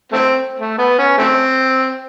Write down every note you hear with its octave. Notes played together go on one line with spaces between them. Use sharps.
A3 C4
A3
B3
C#4
A3 C4